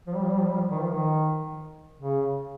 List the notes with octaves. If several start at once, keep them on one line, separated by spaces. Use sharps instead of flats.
F3
G3
F3
G3
F3
G3
F3
D#3
F3
D#3
C#3